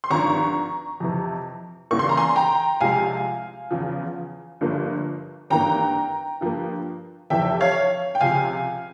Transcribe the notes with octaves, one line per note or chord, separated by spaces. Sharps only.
C6
G#1 G2 F3 A#5 C#6
F2 C3 E3
E2 C#3 E3 G3 A#3 C#6
C6
A#5
G#5 C6
G5 A#5
C2 C3 F3 G#3 F5 G#5
E2 C#3 F3
G1 G2 F3 A#3
G#1 G2 E3 A#3 G5 A#5
G2 F3 A#3
F1 F2 C3 E3 E5 G5
C#5 F5
G5
C#2 C3 F3 F5 G#5